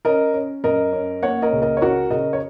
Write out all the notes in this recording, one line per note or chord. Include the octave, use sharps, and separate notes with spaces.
C#4 A#4 D#5
C#4
F#2 A#4 D#5
C#4
A#3 C#5 F#5
A#4 D#5
C#2
A#4 D#5
C#5
C#4 F#4 A#4
C#3 A#4 D#5
C#5